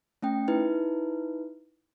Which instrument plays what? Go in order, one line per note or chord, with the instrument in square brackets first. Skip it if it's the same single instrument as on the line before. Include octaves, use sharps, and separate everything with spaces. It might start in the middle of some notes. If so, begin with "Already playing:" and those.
[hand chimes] A3 C#4 G5
D#4 E4 B4